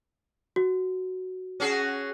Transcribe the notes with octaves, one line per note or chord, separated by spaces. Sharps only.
F#4
C#4 F#4 G#4